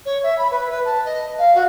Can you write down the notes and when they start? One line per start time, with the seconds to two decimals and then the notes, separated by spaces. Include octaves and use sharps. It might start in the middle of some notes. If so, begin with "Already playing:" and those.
0.05 C#5
0.23 E5
0.38 B5
0.51 B4
0.69 B4
0.85 A5
1.05 D#5
1.38 F5
1.55 F#4